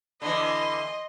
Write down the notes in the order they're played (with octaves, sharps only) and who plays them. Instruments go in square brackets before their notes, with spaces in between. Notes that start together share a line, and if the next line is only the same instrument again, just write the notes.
[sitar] D3 E3 [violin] D#5 [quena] B5 [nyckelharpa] C6